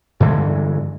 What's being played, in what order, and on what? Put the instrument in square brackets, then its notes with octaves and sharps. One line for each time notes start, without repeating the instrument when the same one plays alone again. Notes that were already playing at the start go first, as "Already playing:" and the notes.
[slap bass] G2 D3 E3 G#3